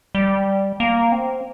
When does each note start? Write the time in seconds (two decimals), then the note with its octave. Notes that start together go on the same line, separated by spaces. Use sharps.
0.15 G3
0.80 A#3
1.12 C4